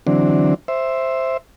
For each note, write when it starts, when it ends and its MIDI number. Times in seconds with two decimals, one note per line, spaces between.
0.07 0.54 50
0.07 0.54 52
0.07 0.54 54
0.07 0.54 60
0.07 0.54 62
0.68 1.37 72
0.68 1.37 76